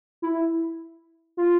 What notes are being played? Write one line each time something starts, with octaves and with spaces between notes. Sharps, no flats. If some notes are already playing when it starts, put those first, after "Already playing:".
E4
F4